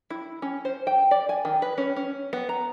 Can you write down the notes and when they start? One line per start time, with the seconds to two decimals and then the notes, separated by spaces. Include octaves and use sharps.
0.10 E4
0.42 C#4
0.65 C5
0.87 G5
1.11 D5
1.29 G#5
1.45 D#3
1.62 B4
1.78 C#4
1.96 C#4
2.33 B3
2.49 A#5